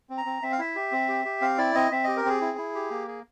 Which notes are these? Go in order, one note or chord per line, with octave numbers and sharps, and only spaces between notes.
C4
A#5
C4
C4 E5
F5
E4 E5
G4
C4
G4
G4
C4 F5
E4 D5
C4 D#5
C4 E5
G4 D#5
A#4
C4 G#4
E4
E4
G4
A#3
G#4